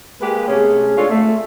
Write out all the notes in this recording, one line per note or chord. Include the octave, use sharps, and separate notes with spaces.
G#3 A#3 G4 B4
C3 A3 C#4 G#4
G#3 D4 F4 A4 C#5
A3